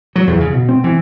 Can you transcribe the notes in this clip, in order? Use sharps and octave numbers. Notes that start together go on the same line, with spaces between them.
F#3
E2
C#3
B2
C4
E3